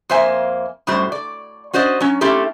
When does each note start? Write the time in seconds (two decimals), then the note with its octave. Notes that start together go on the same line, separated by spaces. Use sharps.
0.09 F2 A#3 C5 E5 G#5
0.87 F#2 A2 G3 F#4 C5
1.12 D5
1.73 C#4 F#4 C5 D5 D#5
2.00 F#3 C#4
2.21 A3 C4 C#4 E4 G4 A4